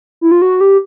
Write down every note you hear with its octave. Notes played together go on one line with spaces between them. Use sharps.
E4
F4
F#4
G4